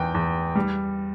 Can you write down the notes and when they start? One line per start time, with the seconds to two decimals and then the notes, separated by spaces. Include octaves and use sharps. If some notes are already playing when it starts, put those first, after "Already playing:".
Already playing: E2 G5
0.15 E2
0.55 G3